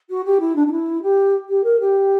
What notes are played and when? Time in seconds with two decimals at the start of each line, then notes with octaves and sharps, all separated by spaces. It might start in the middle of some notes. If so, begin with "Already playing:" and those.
0.09 F#4
0.24 G4
0.40 E4
0.55 D4
0.66 D4
0.71 E4
1.02 G4
1.49 G4
1.63 A#4
1.79 G4